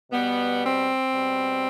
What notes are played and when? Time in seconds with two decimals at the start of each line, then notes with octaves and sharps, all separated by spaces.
0.11 B2 G3 B3
0.63 C4
1.13 B2 G3